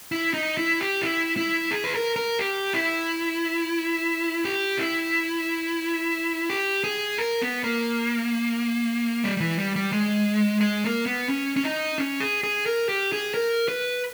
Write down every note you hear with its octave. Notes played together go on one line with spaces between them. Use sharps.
E4
D#4
E4
G4
E4
E4
G#4
B4
A#4
A#4
G4
E4
G4
E4
G4
G#4
A#4
B3
A#3
G3
G3
E3
G3
G3
G#3
G#3
A#3
B3
C#4
C#4
D#4
C#4
G#4
G#4
A#4
G4
G#4
A#4
B4